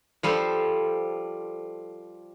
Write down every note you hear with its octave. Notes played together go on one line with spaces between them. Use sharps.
F3 G3 A4 C5